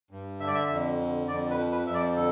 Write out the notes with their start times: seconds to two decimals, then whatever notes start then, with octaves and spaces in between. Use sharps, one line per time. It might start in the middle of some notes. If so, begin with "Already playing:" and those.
0.11 G2
0.40 D3 E5
0.48 D5
0.55 E5
0.70 F2
0.98 D3
1.28 F2 D5
1.50 B4
1.58 F3
1.72 B4
1.87 F2 E5
1.94 D5
2.16 D3 A4